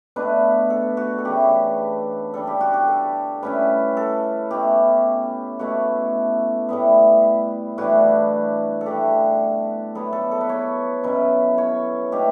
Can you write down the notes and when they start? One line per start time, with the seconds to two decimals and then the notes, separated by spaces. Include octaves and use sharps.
0.16 B2 A3 D4 B4
0.70 A4
0.97 F#4
1.18 A4
1.25 C#3 E3 A3 D4 G4
2.34 D3 G3 D4 A4
2.47 G4
2.61 F#4
2.74 G4
2.88 A4
3.42 A2 G3 C#4 E4 B4
3.97 A4
4.51 B2 A3 C#4 E4 G4
5.59 B2 A3 E4 F#4
6.69 A2 G3 B3 E4
7.78 A2 E3 G3 D4 F#4
8.81 A4
8.86 D3 A3 D4 G4
9.95 F#3 B3 E4 A4
10.13 A4
10.31 A4
10.41 B4
10.49 C#5
11.03 B2 F#3 C#4 E4
11.58 C#5
12.12 B2 A3 D4 G4